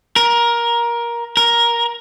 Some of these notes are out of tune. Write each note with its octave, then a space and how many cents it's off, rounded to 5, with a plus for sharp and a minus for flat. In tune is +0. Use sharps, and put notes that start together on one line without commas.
A#4 +15
A#4 +10